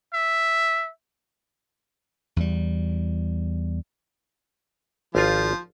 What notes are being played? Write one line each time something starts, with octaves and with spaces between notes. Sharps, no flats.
E5
E2 G3
G#1 F3 F4